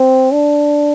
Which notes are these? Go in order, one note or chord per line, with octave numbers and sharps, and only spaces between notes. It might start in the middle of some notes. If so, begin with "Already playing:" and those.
Already playing: C4
D4